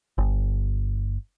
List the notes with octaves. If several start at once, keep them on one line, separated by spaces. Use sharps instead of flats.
G1